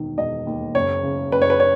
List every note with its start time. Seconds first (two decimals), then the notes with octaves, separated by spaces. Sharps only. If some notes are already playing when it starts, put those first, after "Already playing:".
Already playing: E1 D#3
0.17 E1 D#5
0.47 D#2
0.75 F#1 C#5
1.03 C#3
1.32 F#1 B4
1.42 C#5
1.50 B4
1.60 C#5